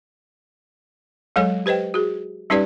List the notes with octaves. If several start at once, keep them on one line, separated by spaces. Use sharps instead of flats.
F#3 G#3 A4 C#5 G#5
G4 B4 C5 D#5 G5
F#4 G#4
G3 C#4 D#4 G4 B4 D5